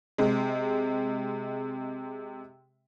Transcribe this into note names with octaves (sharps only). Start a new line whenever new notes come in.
C3 G#3